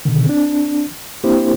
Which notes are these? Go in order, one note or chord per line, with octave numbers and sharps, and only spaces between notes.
B2 D3 D#3
C4 D4
A#3 C4 D4 E4 G4 C5